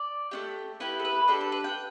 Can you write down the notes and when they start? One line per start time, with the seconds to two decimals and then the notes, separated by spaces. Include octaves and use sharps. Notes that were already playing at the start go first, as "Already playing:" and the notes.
Already playing: D5
0.31 A3 D4 G4
0.80 B3 E4 G4 B4
0.99 A4
1.05 B4
1.28 D4 G4 A4
1.41 A4
1.52 B4
1.64 G5